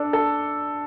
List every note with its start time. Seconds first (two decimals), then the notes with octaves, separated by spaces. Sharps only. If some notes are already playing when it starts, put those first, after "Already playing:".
Already playing: D4 A4
0.13 A4